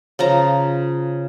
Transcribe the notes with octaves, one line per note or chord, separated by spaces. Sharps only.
C#3 F3 A#5